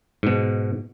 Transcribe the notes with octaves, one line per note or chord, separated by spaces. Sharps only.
G#2 B2